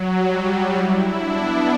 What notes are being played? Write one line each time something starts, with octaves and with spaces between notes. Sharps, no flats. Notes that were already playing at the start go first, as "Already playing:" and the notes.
Already playing: F#3
G3
E4
D4
B3